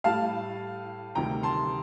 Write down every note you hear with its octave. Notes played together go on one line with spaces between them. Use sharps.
A2 G3 F5 A5
D2 C3 D#3 G3 G5 A#5
A5 C6